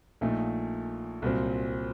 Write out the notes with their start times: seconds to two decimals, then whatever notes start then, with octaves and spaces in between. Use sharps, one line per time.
0.21 A#1 A#2 A3 D#4
1.22 C2 A#2 F#3 C4